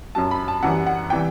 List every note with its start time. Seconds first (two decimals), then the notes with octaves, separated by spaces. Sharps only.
0.15 F#2 F#3 A5
0.31 B5
0.48 A5
0.63 F#2 E3 G3 F#5
0.87 F#5
1.10 C3 E3 G3 G5